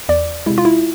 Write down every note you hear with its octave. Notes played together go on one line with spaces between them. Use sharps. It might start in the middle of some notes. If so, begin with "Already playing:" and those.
E2 D5
C3 G#3 E4
F4
E4